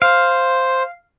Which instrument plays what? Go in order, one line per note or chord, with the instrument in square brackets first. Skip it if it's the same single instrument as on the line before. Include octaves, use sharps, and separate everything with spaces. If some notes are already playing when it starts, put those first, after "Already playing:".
[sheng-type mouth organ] C5 [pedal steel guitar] F5